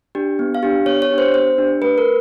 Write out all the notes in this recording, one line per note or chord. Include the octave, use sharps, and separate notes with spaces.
D4 G4
B3
F5
D4 G4
B3 C#5
C#5
D4 G4
C5
B3 C5
D4 G4
A3 B4
A#4